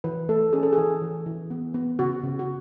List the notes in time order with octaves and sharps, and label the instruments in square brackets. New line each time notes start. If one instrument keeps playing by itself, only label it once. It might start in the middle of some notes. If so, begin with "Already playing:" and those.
[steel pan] E3 B4
A3 A4
C#4 G#4
A4
E3 G#4
E3
E3
B3
B3
C#3 F#4
C#3
F#4